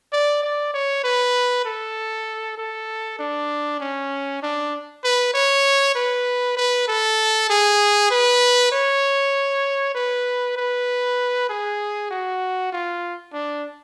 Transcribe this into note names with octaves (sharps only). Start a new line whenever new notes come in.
D5
D5
C#5
B4
A4
A4
D4
C#4
D4
B4
C#5
B4
B4
A4
G#4
B4
C#5
B4
B4
G#4
F#4
F4
D4